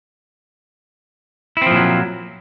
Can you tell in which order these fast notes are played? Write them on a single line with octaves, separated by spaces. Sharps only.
E4 C4 F3 A#2 F#3